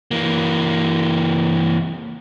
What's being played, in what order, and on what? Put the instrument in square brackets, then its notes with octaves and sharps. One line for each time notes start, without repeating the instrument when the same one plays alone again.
[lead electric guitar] E3 A#3